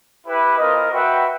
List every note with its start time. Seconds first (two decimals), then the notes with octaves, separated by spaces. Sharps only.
0.24 E4 G4 B4
0.58 C4 F4 A#4 D#5
0.91 F#4 B4 E5 G5